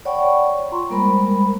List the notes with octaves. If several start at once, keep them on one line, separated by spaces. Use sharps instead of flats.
C#5 D5 F#5 G5 B5 C#6
F4 A#5 C6 C#6
G3 G#3 A#3 A#4 C5 B5